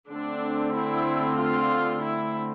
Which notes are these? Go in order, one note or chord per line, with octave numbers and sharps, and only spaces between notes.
D3 A3 C4 D4
E4
F4
E4